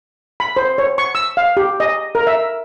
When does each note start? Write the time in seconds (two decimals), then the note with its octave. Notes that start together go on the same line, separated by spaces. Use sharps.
0.40 B5
0.57 C5
0.78 C#5
0.98 C#6
1.15 E6
1.37 F5
1.57 G4
1.80 D#5
2.15 A#4
2.27 E5